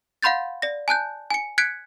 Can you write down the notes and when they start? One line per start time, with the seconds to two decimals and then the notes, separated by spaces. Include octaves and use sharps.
0.23 F5 F#5 B5 C6 G6 A6
0.62 D5 A#6
0.88 G#5 A5 F#6 G6
1.30 G#5 C#7
1.58 F#6 G#6 B6 C#7 D7